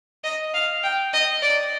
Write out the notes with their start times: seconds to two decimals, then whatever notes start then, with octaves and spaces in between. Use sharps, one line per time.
0.24 D#5
0.54 F5
0.83 G5
1.13 D#5
1.42 D5